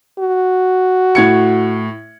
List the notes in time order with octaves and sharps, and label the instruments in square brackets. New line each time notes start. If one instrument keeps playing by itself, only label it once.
[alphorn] F#4
[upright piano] A2 G#6 C#7